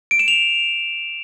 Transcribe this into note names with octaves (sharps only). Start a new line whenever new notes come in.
D7
E7
F7